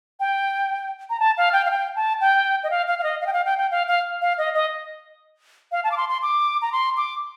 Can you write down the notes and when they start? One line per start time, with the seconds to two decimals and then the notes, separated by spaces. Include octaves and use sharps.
0.20 G5
1.10 A#5
1.20 A5
1.37 F5
1.53 G5
1.65 F5
1.70 G5
1.96 A5
2.21 G5
2.63 D#5
2.71 F5
2.87 F5
2.99 F5
3.03 D#5
3.21 F5
3.27 G5
3.33 F5
3.45 G5
3.58 G5
3.71 F5
3.87 F5
4.22 F5
4.38 D#5
4.54 D#5
5.72 F5
5.84 A5
5.91 D6
5.97 C6
6.09 C6
6.22 D6
6.62 A#5
6.72 C6
6.97 D6